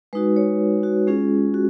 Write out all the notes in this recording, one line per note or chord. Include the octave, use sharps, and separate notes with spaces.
G#3 D#4 F#4 B4
C#5
F#4
G#3 C#4 F4 G#4
F#4